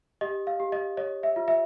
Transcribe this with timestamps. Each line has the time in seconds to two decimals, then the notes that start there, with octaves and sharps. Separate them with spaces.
0.21 G4 D#5
0.47 F5
0.60 G4
0.72 D#5
0.97 C#5 D#5
1.23 E5
1.36 F4
1.48 E5